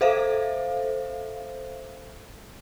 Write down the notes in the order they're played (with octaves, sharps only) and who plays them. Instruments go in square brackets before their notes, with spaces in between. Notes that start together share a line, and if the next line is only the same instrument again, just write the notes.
[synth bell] A4 C5 E5 F5